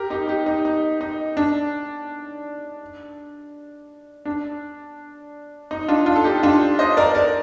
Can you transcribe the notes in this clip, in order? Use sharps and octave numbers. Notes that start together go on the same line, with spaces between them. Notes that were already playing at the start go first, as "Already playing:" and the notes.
Already playing: G4 A#4
D#4 G4
D#4 G4
D#4
D#4
D#4
D4
D4
D#4
D4 F4
D4 F4
A4
D#4 G4
D4 F4
C5 D#5
A#4 D5
A#4 D5